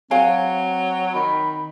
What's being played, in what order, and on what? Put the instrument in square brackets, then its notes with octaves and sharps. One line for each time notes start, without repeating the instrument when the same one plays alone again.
[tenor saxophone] F#3 [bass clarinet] C4 [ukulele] F5 G#5
[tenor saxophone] D#3 [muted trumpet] B5